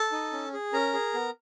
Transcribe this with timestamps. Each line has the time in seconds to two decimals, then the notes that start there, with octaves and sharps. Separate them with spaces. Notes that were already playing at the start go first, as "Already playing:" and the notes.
Already playing: A4 A5
0.12 D#4
0.32 C#4
0.53 G#4
0.73 C#4 A#4 A#5
0.93 G#4
1.14 B3